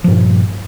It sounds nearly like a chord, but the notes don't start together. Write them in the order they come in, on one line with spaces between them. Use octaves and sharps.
F3 G2 A#2